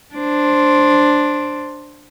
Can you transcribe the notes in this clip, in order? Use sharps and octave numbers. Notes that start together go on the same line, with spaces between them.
D4 C5